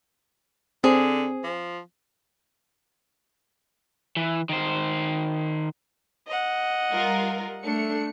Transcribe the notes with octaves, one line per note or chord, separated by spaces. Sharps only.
D3 C4 G#4
F3
E3
D#3 C5
D#5 F#5
G3 F4 A#4
A3 D4 C#7